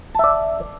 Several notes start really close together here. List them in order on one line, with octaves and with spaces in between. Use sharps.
A5 E5 D5